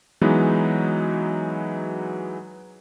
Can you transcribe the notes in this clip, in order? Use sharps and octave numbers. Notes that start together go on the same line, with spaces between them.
E3 F#3 G#3 B3 D#4